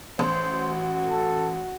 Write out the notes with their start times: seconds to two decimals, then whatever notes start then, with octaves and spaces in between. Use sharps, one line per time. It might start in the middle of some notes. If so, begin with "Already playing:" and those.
0.19 A1 C5
0.53 F#4
1.06 A4